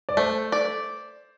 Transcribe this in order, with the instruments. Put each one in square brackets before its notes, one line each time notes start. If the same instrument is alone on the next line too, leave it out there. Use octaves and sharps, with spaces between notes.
[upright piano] D5
[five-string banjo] A3 [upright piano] C5
[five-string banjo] D5